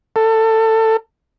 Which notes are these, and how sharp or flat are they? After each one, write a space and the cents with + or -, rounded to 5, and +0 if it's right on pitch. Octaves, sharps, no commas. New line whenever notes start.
A4 +20